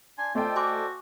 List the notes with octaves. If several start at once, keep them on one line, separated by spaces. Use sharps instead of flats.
D4 G#5 C6
A3 F4 A4 C5 D5 D#5 G5
F#4 G#5 C6 D6